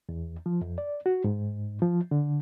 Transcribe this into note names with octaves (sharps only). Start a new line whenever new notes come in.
E2
F3
F2
D5
F#4
G#2
F3
D3